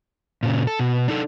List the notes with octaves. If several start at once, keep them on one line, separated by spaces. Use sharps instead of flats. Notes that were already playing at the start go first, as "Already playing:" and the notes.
A#2 C#3
A4
B2
D4 D#4 A4